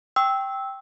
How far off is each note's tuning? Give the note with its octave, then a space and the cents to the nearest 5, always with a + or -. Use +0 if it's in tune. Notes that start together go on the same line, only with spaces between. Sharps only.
G5 +0 C#6 -40 E6 -10